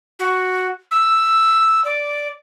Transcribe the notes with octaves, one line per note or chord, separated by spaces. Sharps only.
F#4
E6
D5